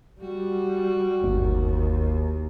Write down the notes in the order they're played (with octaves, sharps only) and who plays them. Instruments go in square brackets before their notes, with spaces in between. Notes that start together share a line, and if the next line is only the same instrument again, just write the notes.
[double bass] G3 [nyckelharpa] F#4
[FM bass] G1 [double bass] D#2